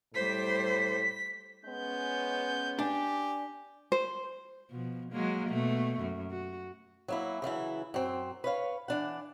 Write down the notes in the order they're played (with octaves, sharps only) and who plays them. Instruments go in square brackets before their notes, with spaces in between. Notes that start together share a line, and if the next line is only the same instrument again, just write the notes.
[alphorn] A2 [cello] G3 C5 [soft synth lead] B6
[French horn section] G#3 B3 C#4 [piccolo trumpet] G6
[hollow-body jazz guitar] D4 [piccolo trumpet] G4 [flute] G#5
[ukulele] C5
[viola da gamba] B2 F3
F#3 G#3 A#3
B2 A3
F#2
F#4
[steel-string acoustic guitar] F#3 A#3 E4
C#3 E3 F#3 E4
F#2 C4
B4 C#5 F5
E3 D4 F#5